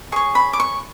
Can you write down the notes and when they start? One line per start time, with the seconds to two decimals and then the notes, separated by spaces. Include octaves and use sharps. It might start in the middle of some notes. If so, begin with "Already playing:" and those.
0.12 G#4 C#5 C#6
0.35 B5
0.53 D6
0.60 C#6